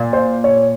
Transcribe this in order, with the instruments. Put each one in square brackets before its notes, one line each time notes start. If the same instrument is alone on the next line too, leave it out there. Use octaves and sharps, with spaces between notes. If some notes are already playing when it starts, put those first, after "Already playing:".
Already playing: [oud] A#2
[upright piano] C5
C#5